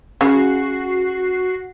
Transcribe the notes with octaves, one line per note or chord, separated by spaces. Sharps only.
C#3 F#4 C7